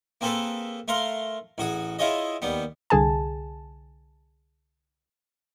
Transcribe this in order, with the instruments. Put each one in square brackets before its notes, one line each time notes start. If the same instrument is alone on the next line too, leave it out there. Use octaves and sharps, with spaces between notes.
[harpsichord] A#3 C4 G#4 A4 B4
A3 A#4 F5 C6
A1 F#4 G#4
E4 F4 G#4 C#5 D#5
D#2 G3 B3
[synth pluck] C2 D3 G#4 G#5 A5